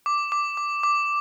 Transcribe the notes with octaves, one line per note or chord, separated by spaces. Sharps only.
D6
D6
D6
D6